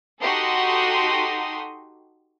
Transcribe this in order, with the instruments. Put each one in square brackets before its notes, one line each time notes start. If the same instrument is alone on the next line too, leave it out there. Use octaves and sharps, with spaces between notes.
[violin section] D#4 F#4 G4 A4 C6 D#6